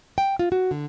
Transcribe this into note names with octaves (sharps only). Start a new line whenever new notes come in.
G5
F4
F#4
D3